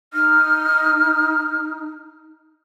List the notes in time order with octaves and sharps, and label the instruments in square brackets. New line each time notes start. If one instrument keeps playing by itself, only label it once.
[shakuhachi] D#4 [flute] F6